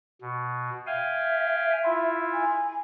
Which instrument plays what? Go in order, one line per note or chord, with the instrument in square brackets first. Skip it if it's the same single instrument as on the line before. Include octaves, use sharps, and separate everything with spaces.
[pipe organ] B2
[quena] E5 [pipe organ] F5 G5 G#5
[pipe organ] E4 F4
[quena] G#5